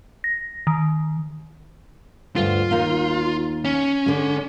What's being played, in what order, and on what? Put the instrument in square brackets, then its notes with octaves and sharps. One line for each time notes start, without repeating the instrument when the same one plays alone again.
[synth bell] A#6
D#3
[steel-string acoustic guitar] D2 G2 C5 [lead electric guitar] F4
[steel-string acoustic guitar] D#2 D#4 F5
[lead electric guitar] C#4
[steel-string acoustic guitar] D3 G#3